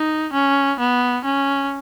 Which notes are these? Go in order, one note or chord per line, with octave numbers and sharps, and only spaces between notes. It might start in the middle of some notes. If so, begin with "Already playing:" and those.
Already playing: D#4
C#4
B3
C#4